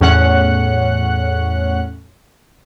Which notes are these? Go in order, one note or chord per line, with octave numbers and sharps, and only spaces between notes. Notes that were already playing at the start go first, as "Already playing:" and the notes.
E2 A2 C#4 F#5 F#6 C#7